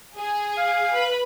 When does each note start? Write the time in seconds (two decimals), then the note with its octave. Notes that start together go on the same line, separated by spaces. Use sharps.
0.16 G#4
0.57 F5
0.93 B4 B5